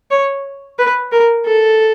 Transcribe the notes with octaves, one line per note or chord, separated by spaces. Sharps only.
C#5
B4
A#4
A4